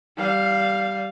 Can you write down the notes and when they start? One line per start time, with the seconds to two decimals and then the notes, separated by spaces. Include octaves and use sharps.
0.17 G3 F5